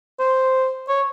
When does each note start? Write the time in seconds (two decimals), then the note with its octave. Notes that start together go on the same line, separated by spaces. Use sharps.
0.20 C5
0.88 C#5